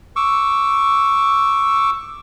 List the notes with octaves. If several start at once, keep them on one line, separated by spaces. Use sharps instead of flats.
C#6 D6 E6